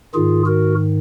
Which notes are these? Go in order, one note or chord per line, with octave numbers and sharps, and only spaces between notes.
G#2 D#3 F4 G#4
F#4 A#4